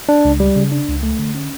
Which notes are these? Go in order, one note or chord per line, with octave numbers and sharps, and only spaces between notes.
D4
C#2
G3
C#3
D4
C#2
A3
D3
C#4